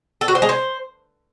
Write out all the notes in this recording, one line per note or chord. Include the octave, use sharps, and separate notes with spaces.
A4
F#4
C5
G#3
C5